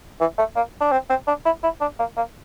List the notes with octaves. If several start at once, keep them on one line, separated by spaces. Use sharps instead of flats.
E3
A3
A#3
D4
C4
C4
D4
E4
E4
D4
A#3
A#3